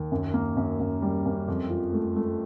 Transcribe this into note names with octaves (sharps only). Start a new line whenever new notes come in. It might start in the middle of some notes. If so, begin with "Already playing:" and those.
Already playing: D#2
F#2
A#3
F#2
F#2
G3
F#2
F2
F3
A3
A3